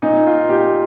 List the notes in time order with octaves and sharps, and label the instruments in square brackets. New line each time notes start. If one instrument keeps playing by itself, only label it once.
[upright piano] A#2 D#4
F4
A#2 G4